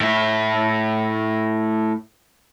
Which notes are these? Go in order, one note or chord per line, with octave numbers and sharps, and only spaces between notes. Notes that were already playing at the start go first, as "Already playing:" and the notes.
A2 E5